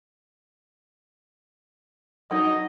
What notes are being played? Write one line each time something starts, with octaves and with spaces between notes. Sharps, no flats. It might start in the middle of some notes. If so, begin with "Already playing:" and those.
F#3 D#4 D#5